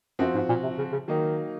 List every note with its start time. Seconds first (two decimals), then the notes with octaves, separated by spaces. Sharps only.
0.19 F#2 F3 C4 F#4
0.35 G#2
0.49 A#2
0.63 C3
0.78 C#3
0.92 C#3
1.08 D#3 F#3 A#3 D#4